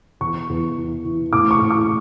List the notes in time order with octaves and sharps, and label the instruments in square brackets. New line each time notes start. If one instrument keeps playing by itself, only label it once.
[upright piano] E2 C#6
E2
E3
E3
A2 D6
C#6
A2
D6